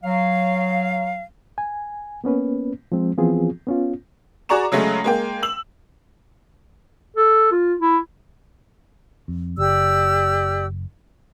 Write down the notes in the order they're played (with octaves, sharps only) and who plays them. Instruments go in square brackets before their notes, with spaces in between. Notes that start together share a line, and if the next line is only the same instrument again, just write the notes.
[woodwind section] F#3 F5
[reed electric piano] G#5
A#3 B3 C#4 B4
F3 G#3 C4
E3 F3 B3 C4 F4 G#4
B3 C#4 F4
[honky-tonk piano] F#4 G#4 D5 A#5 C#6 E7
C#3 F#3 G#3 A3
G#3 A#3 G5
E6 F#7
[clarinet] A4
F4
E4
[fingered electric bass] F2
[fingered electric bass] F#1 [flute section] G4 D5 E6